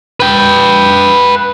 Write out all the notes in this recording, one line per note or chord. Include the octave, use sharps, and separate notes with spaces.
B4 G5